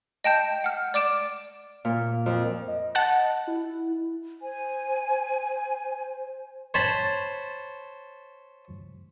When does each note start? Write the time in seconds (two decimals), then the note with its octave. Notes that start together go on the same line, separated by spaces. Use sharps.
0.24 D#5 G5 A5 G6
0.64 F#5 F6
0.94 D5 D6 D7 E7
1.85 A#2
2.26 F2
2.68 D#5
2.95 F#5 A5 F#6
3.47 E4
4.42 C5 G#5
6.74 C5 C#5 A5 B5